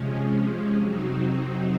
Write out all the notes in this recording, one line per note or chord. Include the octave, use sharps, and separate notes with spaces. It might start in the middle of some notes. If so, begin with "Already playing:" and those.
Already playing: C3 F3 G#3 C#4
F2 C3 F#3 C4 D#4